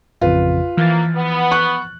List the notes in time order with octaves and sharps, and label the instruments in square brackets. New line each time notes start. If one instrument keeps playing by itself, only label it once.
[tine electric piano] A1 F2 C#3 [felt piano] F4 B4
[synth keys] E3 F3 [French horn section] A#3 [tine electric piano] F6 A6
[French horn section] B3
[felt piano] C#6 F#6